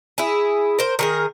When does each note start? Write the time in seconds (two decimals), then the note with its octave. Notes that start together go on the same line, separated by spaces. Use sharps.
0.18 E4 G#4
0.79 A#4 C5
0.99 D#3 G#4 A#4